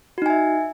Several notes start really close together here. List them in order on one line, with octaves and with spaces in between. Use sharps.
F#4 D#4 G#5 E5